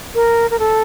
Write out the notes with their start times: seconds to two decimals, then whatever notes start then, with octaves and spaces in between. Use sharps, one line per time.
0.15 A#4
0.51 A#4
0.59 A4